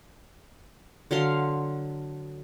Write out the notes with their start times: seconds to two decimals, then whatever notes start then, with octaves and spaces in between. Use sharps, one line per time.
1.11 D3 F#3 F5 C6